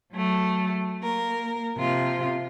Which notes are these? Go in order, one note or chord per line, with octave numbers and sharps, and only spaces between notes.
F#3 A3
A#3 A#4
C3 F3 F4